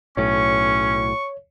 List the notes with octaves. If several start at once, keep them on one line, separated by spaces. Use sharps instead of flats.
B1 A2 C#4 C#5 C#6